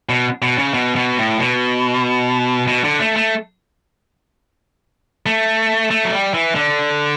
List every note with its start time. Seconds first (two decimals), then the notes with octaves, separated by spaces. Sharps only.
0.09 B2
0.42 B2
0.58 C#3
0.74 B2
0.96 B2
1.17 A2
1.38 B2
2.67 B2
2.84 D3
3.00 A3
3.16 A3
5.26 A3
5.91 A3
6.05 F#3
6.12 G3
6.34 E3
6.55 D3